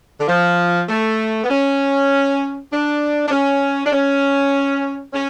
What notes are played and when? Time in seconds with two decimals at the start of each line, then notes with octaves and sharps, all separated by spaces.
0.19 D3
0.27 F3
0.88 A3
1.44 B3
1.50 C#4
2.71 D4
3.26 D4
3.31 C#4
3.85 D4
3.92 C#4
5.13 C#4